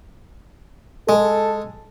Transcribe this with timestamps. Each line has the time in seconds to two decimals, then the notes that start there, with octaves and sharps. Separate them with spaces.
1.09 G#3 A4